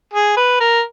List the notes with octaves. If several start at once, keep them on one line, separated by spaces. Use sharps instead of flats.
G#4
B4
A#4